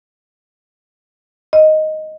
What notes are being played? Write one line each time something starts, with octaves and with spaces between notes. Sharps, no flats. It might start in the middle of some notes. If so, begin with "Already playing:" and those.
D#5